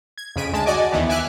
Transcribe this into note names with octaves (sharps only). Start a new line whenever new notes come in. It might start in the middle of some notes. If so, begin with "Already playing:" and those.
G#6
F2 C#3 B6 D7 D#7
D2 G#3 A5
F#4 D5 D#5 G#5 D6
D#2 D#3 E3 B3
E5 G#5 D6 F6 F#6